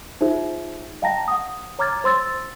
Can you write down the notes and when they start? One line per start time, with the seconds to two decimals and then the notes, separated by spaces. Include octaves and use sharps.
0.21 D#4 F4 G#4 C5 E5
1.02 D#5 F5 G5 A5 A#5 A#6
1.28 F#5 D#6
1.79 C#5 A#5 D6 F6 G#6 A6
2.04 C5 C6 E6 A6